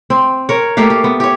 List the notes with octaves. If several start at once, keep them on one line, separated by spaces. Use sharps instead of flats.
C4
A#4 C#5
A3 A#3 G4 F5
G4
B3
G4 C#5